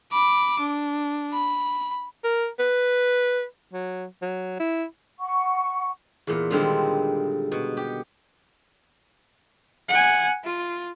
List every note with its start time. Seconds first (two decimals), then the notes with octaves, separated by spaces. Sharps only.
0.13 B5 D6
0.60 D4
1.34 B5
2.24 A#4
2.59 B4
3.73 F#3
4.22 F#3
4.60 E4
5.19 F#5 C#6
6.27 E2 A#2
6.50 A#2 D3 D#3 G3 G#3 C4
7.52 B2
7.77 G4
9.89 F#5 G#5
10.44 F4